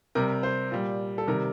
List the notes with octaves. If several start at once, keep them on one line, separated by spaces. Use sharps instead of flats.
C3 G3 A#4
C5
A#2 G3
A4
C3 D#3 G3 A#4